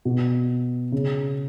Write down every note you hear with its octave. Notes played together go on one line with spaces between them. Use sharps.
B2
C#3